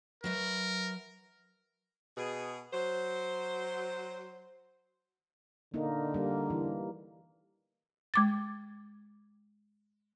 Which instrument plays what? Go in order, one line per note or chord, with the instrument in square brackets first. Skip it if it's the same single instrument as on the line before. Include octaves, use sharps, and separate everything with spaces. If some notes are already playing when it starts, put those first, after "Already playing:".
[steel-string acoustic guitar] F#3 B4 E5 [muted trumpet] A#4
[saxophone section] B2 G#4
F#3 C5
[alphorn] D3 [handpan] A#3 D#4
[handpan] G3 A#3
E3
[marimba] G#3 D6 A6